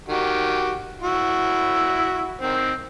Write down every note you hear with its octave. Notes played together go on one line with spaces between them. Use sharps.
D#3 F#4 G4
E4 F#4
D#3 C4